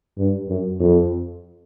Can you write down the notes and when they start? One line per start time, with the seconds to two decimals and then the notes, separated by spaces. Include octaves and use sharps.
0.17 G2
0.48 F#2
0.80 F2